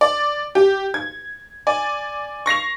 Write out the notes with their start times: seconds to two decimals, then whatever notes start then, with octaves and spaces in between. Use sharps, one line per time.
0.01 D5
0.55 G4
0.94 G#6
1.67 D5 G#5
2.46 C#6 A#6 C7 F7